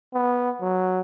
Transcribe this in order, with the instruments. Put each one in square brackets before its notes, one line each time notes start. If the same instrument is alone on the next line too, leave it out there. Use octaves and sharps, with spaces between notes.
[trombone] B3
F#3